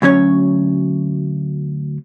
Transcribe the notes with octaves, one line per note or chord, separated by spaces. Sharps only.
D2 F#3 C#4 C#5